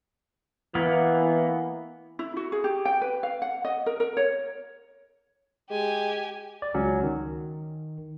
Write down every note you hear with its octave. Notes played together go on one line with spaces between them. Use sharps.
E3 A#3 B3
E4
F#4
G#4
G4
G5
B4
F5
F#5
D#5
A#4
A#4
C#5
G#3 G4 G#5
D5
C#2 F#3 C#4
D#3